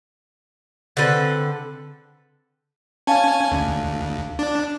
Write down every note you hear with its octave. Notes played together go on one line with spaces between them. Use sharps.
D3 C4 A4 B4
C#4 F5 G#5 A5
D2
D4